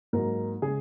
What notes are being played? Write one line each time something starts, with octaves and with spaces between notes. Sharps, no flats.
G#2 F#3 A#3 A#4
C#3 G#3 G#4